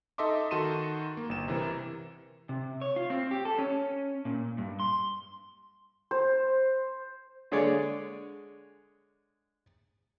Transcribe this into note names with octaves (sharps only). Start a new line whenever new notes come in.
D#4 A4 D#5 E5 C6 D6
D#3 F#4 A4 C6 D#7 E7
A#3
G1 E7
C3 E3 A#4
C3
C#5
F4
C4
G4
A4
C#4
A#2
G2
C6
C5
D3 G#3 G#4 C#5 D5